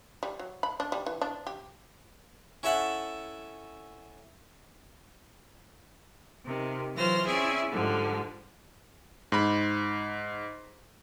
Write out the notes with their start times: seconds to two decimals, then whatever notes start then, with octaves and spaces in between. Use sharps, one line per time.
0.23 G3
0.39 F#3
0.63 B5
0.80 D4
0.92 G3
1.06 E3
1.21 D4
1.47 G4
2.63 C#4 E4 A4 E5 F#5
6.45 C3 D#3
6.96 E3 F#3 F4 C5 F6 A#6
7.26 C4 C#4 E4 G#4 D5 E5
7.70 G#2 D3 F3 G3
9.32 G#2 B5